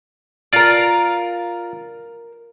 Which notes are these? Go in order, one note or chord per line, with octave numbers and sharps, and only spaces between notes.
F4 A#4 D5 F5